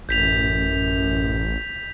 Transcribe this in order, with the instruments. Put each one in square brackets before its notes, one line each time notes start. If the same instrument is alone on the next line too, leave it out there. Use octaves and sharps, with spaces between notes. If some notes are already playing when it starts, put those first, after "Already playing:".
[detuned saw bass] A1 [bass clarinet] F#2 [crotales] G6 B6 F7